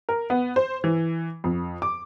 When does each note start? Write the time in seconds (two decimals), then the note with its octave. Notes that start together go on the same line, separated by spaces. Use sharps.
0.09 A#4
0.30 B3
0.56 C5
0.84 E3
1.44 F2
1.82 D6